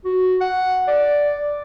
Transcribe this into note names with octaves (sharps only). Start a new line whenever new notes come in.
F#4
F#5
D5